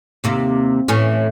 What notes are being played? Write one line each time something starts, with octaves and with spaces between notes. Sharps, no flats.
D#2 C3 A#3
A2 E3 C#4